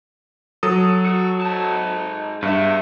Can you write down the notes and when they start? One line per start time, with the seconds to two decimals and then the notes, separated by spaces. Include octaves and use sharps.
0.63 F#3 A4 D#6
1.06 F#4
1.41 G#2 A5
2.43 G2 B3 E5